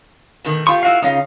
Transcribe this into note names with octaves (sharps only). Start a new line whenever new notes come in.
B2 D#3 A3
A3 F4 G4 C#6
E4 F#4 F5
C#3 C#4 D#4 F4 D#5 F5